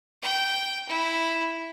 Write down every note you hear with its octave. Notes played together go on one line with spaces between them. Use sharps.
G5
E4